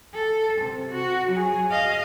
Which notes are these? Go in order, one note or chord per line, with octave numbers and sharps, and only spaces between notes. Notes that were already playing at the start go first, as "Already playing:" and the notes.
A4
C3
F#4
F#3 G#4
D#5 F5